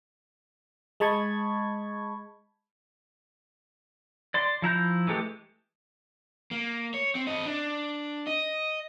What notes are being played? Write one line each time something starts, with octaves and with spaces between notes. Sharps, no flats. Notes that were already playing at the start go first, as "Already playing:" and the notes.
G#3 D#5 A5 B5 C#6 G#6
D5 C6
F3 E4 A#5 G6
E3 G#3 A3 G4
A#3
C#5
C4
C4 D#5
D4
D#5